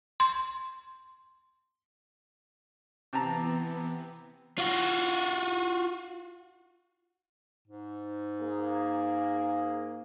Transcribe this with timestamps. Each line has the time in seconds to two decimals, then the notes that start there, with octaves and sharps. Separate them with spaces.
0.20 C6
3.13 C3 E3 B3 A5 A#5
4.58 F4 F#4
7.68 G#2
8.40 A#3 G#4